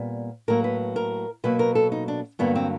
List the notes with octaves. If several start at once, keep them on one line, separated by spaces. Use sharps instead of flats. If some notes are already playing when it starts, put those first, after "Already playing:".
Already playing: A#2 G3 B3
A2 F#3 A#3 A#4
B4
A#4
B2 F#3 A#3 B4
A#4
A4
D#4
D4
G2 D3 F#3 A#3 B3
C4